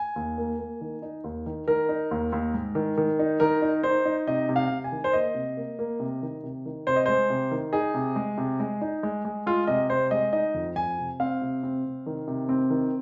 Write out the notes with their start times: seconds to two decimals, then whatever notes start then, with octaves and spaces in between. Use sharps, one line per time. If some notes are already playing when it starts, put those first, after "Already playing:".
Already playing: G#5
0.16 D#2
0.38 A#3
0.59 A#3
0.81 D#3
1.02 D#4
1.24 D#2
1.46 D#3
1.67 D#3 A#4
1.89 D#4
2.11 D#2
2.32 D#2
2.54 G#2
2.75 D#3
2.98 D#3
3.19 D#4
3.40 D#3 A#4
3.62 D#4
3.83 D#4 C5
4.05 D#4
4.27 C3 D#5
4.49 C3
4.56 F5
4.70 C3
4.84 G#5
4.92 D#3
5.04 C5
5.13 A#3 D#5
5.35 C3
5.57 A#3
5.79 A#3
6.00 C3
6.22 D#3
6.43 C3
6.66 D#3
6.87 C3 C5
6.96 D#5
7.06 G#3 C5
7.30 C3
7.51 D#3
7.73 D#4 G#4
7.94 C3
8.16 G#3
8.38 C3
8.60 G#3
8.81 D#4
9.03 G#3
9.25 G#3
9.46 G#3 F4
9.67 C3 D#5
9.90 C3 C5
10.11 G#3 D#5
10.33 D#4 D#5
10.54 F2
10.76 F2 G#5
10.98 C3
11.20 C4 F5
11.42 C3
11.63 C4
11.85 C3
12.06 D#3
12.27 C3
12.49 C4
12.70 D#3